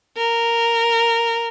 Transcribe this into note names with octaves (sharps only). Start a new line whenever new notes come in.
A#4